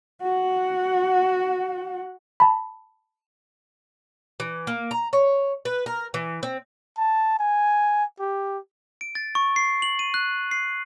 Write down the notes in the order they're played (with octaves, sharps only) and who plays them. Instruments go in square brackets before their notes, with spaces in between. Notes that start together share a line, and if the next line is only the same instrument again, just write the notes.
[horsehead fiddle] F#4 F#5
[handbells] A5 B5
[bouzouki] E3
A#3
A#5
C#5
B4
A#4
E3
C4
[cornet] A5
G#5
G4
[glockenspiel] D7
A6
C#6
C7
F#7
D#7
F#6
C7